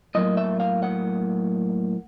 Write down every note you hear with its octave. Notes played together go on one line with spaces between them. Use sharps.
A2 F#3 A#3 D#5
E5
F5
F#5